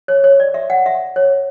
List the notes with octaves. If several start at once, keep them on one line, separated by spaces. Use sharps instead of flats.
C#5
C#5
D5
E5
F#5
E5
C#5